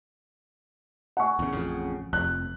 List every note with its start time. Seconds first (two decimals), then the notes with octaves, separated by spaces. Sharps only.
1.17 F#5 G#5 C#6
1.39 E2 C#3
1.53 A1 F2 C#3
2.13 F1 F2 F#6